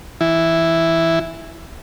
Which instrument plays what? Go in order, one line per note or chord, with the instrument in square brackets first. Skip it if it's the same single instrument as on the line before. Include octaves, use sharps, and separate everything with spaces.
[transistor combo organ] E3 E4